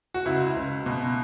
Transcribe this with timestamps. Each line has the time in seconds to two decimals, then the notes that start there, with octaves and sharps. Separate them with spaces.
0.14 F#4
0.25 C#2 E4
0.56 C#2
0.86 B2